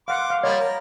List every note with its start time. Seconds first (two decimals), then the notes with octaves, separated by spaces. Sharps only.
0.08 F5 F#5 C6 D6
0.30 F5
0.43 F3 G3 A#3 C#5 D#5
0.60 A#4